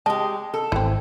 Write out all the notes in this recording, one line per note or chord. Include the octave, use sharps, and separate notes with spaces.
G#3 G4 A5
A4
G#1 E3 C4